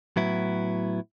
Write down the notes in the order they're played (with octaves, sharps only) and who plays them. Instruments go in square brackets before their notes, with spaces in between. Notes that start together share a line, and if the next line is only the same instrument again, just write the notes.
[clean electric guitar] A2 F#3 B3 E4